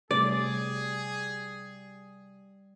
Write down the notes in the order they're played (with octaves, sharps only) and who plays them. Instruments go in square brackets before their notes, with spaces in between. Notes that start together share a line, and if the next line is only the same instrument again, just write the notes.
[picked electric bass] C3 A3 C4 [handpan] G3 [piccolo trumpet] G#4 [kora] D5